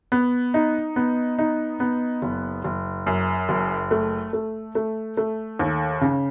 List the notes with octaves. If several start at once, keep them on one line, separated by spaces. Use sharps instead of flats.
B3
D#4
B3
D#4
B3
F#1
F#1
F#2
F#1
A3
A3
A3
A3
D#2
C#3